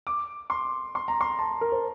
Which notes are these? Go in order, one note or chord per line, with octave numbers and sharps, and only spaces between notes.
D6
C6
C6
A#5
C6
A5
A#4
C5